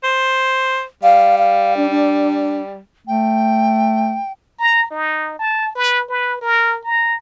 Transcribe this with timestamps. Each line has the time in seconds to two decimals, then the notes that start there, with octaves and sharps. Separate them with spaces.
0.03 C5
1.03 G3 F5
1.38 F5
1.77 D4
1.91 D4
3.07 A3 G5
4.59 A#5
4.91 D#4
5.39 A5
5.75 B4
6.09 B4
6.41 A#4
6.84 A#5